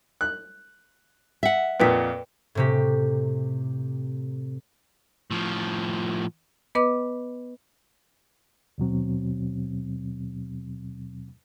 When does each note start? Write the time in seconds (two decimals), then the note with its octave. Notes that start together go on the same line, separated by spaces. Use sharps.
0.21 F#6
1.43 E5 F#5
1.80 F2 A#2 A#3 B4 G5 B6
2.55 A2 C3 G4
5.31 A2 F3
6.75 B3 B4 D#5 D6
8.78 D#2 B2 F#3 C4